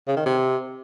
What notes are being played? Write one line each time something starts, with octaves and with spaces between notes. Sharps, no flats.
C#3
D#3
C3